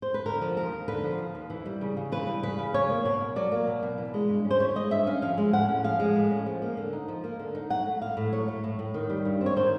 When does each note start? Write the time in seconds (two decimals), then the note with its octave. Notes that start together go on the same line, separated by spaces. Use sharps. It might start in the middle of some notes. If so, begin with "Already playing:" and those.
0.02 C5
0.14 B4
0.26 D3 A#4
0.41 F3
0.57 D#2 A#4
0.72 D#2
0.88 D3 B4
1.04 F3
1.19 D#2
1.35 D#2
1.50 E3
1.65 G3
1.81 C#3
1.97 C#3
2.12 E3 B4
2.27 G3
2.43 C#3 B4
2.59 C#3
2.74 F#3 C#5
2.90 A#3
3.05 B2 C#5
3.21 B2
3.36 F#3 D5
3.52 A#3
3.67 B2
3.83 B2
3.98 E3
4.14 G#3
4.29 G2
4.45 C#4
4.50 C5
4.60 E3 C#5
4.75 G#3 D#5
4.91 G2 E5
5.06 C#4 F5
5.22 F3 F5
5.38 G#3
5.53 A2 F#5
5.68 C#4
5.84 F3 F5
6.00 G#3
6.15 A2
6.31 C#4
6.46 F3
6.62 A#3
6.77 D3
6.93 D#4
7.08 F3
7.24 A#3
7.39 D3
7.55 D#4
7.70 F#3 F#5
7.86 A3
8.01 A2 F5
8.17 A2
8.33 F#3 C#5
8.48 A3
8.64 A2
8.79 A2
8.94 D#3
9.10 G3
9.25 G2
9.41 C4
9.46 C#5
9.56 D#3 C5